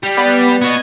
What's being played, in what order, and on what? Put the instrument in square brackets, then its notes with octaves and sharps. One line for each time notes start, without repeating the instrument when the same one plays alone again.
[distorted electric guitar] G3
[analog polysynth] B3 B4 D5
[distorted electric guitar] B3 F#4 [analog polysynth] D#5 G#6